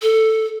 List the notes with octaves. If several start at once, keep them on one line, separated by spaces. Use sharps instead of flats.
A4